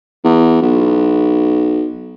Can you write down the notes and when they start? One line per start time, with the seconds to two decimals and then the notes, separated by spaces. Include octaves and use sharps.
0.24 E2
0.62 B1